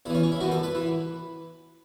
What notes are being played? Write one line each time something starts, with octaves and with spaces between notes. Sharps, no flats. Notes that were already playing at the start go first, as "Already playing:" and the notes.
E2 E3 C#4 E4
C#4
E4
F#2 E3 F#4
A4
B4
E3